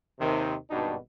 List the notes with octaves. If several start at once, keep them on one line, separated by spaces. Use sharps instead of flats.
D#2 C3 D#3
G#1 G2 B2 D4 D#4 F#4